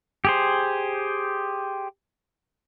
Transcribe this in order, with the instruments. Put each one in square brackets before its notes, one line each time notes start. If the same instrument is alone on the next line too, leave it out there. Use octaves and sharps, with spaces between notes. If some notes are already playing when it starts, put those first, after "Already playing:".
[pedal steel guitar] G4 G#4 C5